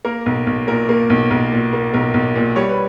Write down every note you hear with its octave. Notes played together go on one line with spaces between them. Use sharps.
A#3 A#4
B1
B1
A#2 A#4
A#3
B1
B1 A#4
A#2
A#3
B1 A#4
B1
A#2
G3 C#5
B4